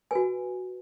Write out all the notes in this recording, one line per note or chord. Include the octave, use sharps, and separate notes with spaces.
F#4 B4 G#5